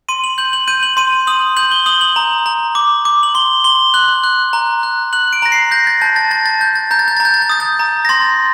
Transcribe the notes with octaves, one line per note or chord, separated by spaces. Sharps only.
C6 D#7
F#7
G6 F#7
F#7
G6 D#7
F#7
C6 D#7
D#6 F#7
G6 F#7
G7
D#6 F#7
F#7
A#5
A#5
D6
D6
F#7
C6 G7
C6 G7
F#6 F#7
F#6
A#5
F#6
F#6 F#7
D7
A#5 A#6
C7
G6 A#6
A6
A5 G6
A6
A5 A6
A6
G6
A6
A#5 G6
A6
G6
A#5 A6
G6
A6
G6
D#6 A6
G6
A#5
A#6
C6 A6